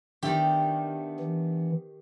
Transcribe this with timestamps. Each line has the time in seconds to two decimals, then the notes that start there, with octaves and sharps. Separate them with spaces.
0.23 D#3 B3 D4 G4 E5
1.20 E3